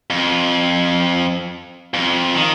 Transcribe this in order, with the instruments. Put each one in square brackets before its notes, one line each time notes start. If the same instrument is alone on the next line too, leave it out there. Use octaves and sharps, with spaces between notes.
[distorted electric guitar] F2
F2
D#3